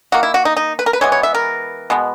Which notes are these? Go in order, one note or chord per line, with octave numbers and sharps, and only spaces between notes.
D#3 A#3 F#4
E4
F#4
D#4
D#4
B4
A#4
B4
E3 G#3 B3 C#5
C#5
E5
A#4
B2 G#3 B3